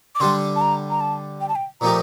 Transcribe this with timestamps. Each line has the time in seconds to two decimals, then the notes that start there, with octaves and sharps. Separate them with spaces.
0.15 D6
0.20 D3 G3 D4 A4 C6
0.56 A5
0.61 A#5
0.90 A#5
1.00 A5
1.41 G5
1.49 A5
1.55 G5
1.81 A#2 F3 A3 D#4 G4 A#5